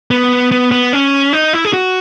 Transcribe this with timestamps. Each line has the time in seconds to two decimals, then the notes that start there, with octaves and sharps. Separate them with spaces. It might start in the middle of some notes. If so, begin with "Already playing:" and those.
0.11 B3
0.52 B3
0.71 B3
0.93 C#4
1.33 D#4
1.53 E4
1.65 G#4
1.73 F#4